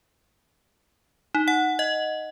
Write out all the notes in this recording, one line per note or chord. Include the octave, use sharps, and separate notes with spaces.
D#4
F#5
D#5